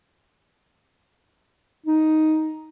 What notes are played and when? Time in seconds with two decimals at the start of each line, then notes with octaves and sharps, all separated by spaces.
1.86 D#4